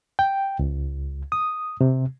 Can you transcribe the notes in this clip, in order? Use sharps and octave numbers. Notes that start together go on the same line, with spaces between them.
G5
C#2
D#6
C3